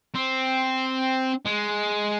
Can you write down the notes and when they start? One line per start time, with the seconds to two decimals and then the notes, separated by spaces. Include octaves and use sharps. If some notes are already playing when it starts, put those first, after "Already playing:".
0.15 C4
1.46 G#3